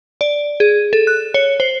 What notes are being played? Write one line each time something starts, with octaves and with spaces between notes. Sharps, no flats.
D5
G#4
A4
F#6
C#5
C5